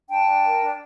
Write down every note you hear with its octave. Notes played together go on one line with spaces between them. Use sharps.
D4 G5 A5
D4
A#4
D4